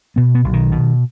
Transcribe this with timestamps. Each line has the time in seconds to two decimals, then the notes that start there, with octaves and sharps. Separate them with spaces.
0.16 B2 B3
0.35 B3
0.44 B1
0.53 D#3
0.72 B2